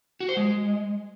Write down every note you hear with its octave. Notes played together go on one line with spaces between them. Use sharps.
F#4
C5
G#3